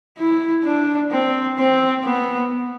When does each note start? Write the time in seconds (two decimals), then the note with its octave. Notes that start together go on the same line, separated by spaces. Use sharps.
0.18 E4
0.64 D4
1.11 C4
1.58 C4
2.05 B3